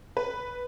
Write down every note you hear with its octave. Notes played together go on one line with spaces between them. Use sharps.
B4